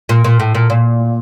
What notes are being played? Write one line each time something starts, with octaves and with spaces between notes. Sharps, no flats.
A#2
A#2
A2
A#2
A#2